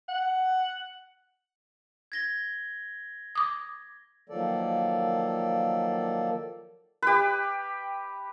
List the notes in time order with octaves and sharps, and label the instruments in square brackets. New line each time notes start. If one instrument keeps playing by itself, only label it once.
[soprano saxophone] F#5
[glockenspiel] G#6 A#6 G7
[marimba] D6 D#6
[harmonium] D#3 F3 F#3 A#3 A4 D5
[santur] G4 B4